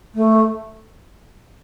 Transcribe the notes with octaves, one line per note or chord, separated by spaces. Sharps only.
A3